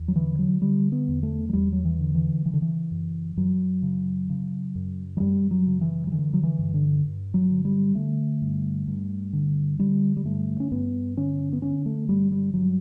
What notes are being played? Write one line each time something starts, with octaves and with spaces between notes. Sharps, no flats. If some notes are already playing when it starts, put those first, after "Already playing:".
Already playing: E2
F#3
D3 E3
F#3
D3 G3
B3
E2
A3
F#3
E2 G3
F#3
E3
D3
E3
C#3 E3
D3
E3
F#2
F#2 F#3
C#3
C#3
F#2
F#3
F#2 G3
F#3
C#3
E3
F#3
D3 E3
F#3
E3
G2
D3
G2
F#3
D3
G3
D3 A3
G2
G2
D3
D3 G3
G3
G2 A3
C#4
G2 B3
D3 C#4
B3
D3 C#4
A3
G2 G3
G3
G2 F#3